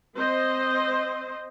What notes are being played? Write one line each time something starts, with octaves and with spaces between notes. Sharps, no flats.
C4 C5 D#5